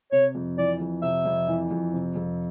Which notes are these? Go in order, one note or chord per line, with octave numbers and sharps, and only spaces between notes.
C3 C#5
F2
E3 D5
F2
C3 E5
F2
E3
F2
C3
F2